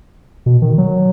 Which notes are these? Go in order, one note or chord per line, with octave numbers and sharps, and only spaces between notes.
B2
D#3
F#3